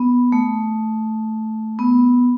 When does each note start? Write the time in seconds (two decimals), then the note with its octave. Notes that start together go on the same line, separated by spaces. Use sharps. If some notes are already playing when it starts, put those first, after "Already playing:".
Already playing: B3
0.32 A3
1.79 B3